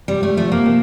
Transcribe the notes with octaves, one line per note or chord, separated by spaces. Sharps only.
C3 G3
A3
F3 A3
A#3
C3